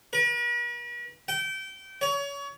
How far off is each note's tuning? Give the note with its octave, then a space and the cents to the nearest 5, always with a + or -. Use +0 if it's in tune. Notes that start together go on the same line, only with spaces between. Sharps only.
B4 -45
G5 -25
C#5 +30